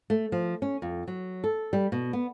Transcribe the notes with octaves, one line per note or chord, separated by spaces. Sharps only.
A3
F3
C#4
F2
F#3
A4
G3
B2
B3